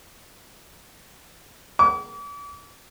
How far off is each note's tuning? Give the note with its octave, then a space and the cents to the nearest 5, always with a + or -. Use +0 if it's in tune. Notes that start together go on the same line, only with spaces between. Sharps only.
D6 -40